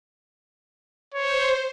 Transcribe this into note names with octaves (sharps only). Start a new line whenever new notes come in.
C5 C#5